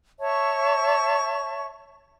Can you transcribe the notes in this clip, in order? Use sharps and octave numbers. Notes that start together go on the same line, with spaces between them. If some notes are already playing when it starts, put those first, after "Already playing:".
C#5 E5 A5 C#6